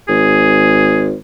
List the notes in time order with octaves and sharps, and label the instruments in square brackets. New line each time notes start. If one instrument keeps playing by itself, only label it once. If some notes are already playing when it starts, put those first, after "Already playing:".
[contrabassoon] G#1 [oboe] G#4